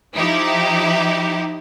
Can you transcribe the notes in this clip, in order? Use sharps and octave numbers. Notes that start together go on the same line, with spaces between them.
F3 D#4 E4 G4